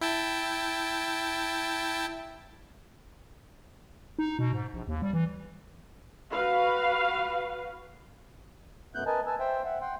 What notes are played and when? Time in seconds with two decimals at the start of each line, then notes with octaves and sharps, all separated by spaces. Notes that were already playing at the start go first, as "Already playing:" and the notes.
0.01 E4 G5 A5
4.19 D#4
4.39 B2
4.53 G#2
4.74 A#1
4.88 D#2
5.02 G3
5.13 E3
6.31 F#4 B4 F5
8.95 F#2 B2 A3 B3 F#6 G6
9.06 A#4 B4 D#5 G#5 A5
9.27 B4 G#5 A5 E6
9.40 C5 E5 G5
9.65 E5 F#5
9.81 F#5 G5 C6